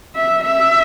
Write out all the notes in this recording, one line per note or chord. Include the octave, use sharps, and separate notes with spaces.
E5
E5